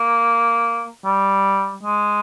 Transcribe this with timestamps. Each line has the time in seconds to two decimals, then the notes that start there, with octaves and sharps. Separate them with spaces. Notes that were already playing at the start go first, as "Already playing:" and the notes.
Already playing: A#3
1.05 G3
1.83 G#3